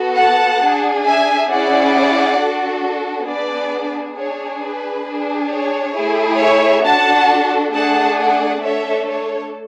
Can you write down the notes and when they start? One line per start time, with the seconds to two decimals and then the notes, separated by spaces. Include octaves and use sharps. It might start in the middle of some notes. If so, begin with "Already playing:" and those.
Already playing: B3 F#4 A4
0.17 F#5 A5
0.61 D4 G#4
1.05 E5 G#5
1.50 C#4 E4 G#4 D5 F#5
2.39 D4 F#4 A4
3.28 B3 D4 G#4 B4 D5
4.17 D4 G#4 C#5
4.62 B4
5.06 D4 G#4
5.51 C#5
5.95 A3 E4 G#4
6.40 C#5 E5
6.84 D4 F#4 A4 F#5 A5
7.73 A3 D4 G#4 F#5 A5
8.18 D5 F#5
8.62 A3 D4 A4 C#5 E5
9.07 C#5